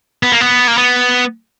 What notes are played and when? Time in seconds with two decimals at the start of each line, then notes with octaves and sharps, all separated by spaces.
0.23 B3
0.32 A#3
0.41 B3
0.68 A#3
0.78 B3